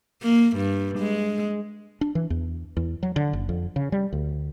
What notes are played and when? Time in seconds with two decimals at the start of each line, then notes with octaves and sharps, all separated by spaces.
0.22 A#3
0.56 G2
0.98 G#3
2.01 D4
2.15 E3
2.30 E2
2.77 E2
3.03 F#3
3.16 D3
3.33 F#1
3.49 F2
3.76 C#3
3.92 G3
4.13 D2